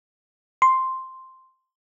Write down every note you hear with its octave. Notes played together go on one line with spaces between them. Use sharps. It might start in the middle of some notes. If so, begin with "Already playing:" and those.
C6